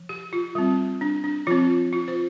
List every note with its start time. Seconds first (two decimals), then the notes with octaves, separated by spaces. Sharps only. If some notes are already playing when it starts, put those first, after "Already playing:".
Already playing: F3
0.09 G4
0.33 F4
0.55 G3 C4
1.01 D4
1.24 D4
1.47 F3 C4 F4
1.93 F4
2.08 C5